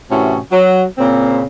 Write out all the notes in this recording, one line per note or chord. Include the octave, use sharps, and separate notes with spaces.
A2 C3 E3 C#4 F#4
F#3
A#2 C#3 C4